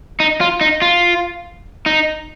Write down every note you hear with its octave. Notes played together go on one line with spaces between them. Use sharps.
D#4
F4
D#4
F4
D#4